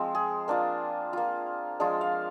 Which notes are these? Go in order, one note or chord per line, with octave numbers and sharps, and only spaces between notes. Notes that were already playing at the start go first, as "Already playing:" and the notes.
Already playing: F3 G#3 C4
G#4
A#3 D4 F4
A#3 F4
F3 G#3 D4 F4 G#4
F5